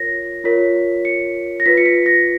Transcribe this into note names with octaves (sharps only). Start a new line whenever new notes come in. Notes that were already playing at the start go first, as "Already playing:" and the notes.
Already playing: F4 A#4 C#5 A#6
F4 A#4 C#5 B6
C#7
A#6
F4 B4 B6
C#7
B6
A#6